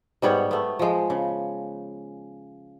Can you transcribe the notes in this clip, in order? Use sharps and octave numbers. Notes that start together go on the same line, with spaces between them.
G#2 G3 B3 C#5
A3 B3
F3 G#3
C#3